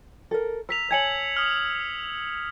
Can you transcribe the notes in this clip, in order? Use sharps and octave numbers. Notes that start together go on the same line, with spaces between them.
A4 A#4
A#4 E6 B6 F7
C#5 G#5 A5 G#6 C#7 F#7
D#6 F6